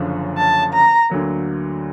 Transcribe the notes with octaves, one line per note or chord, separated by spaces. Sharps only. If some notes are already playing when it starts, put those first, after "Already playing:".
Already playing: F#1 F#2 D3 F3
A5
A#5
D2 D3 F#3 A#3